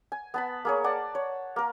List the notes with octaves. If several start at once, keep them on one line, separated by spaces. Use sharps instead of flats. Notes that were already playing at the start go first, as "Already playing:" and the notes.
G#5
B3 A5 B5
A#3 G#4 C#5
D5 F#5 A5
C#5
A#3 A#4